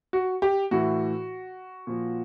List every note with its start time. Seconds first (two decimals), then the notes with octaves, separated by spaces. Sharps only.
0.13 F#4
0.42 G4
0.71 A2 E3 F#4
1.87 A#2 F3